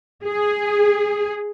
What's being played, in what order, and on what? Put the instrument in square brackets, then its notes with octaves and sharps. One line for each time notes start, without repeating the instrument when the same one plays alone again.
[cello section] G#4